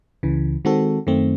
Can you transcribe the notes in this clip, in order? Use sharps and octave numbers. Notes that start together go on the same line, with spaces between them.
C#2 C#3 E3
D#3 G#3 C4 F#4 A4
F#2 D#3 A3 C4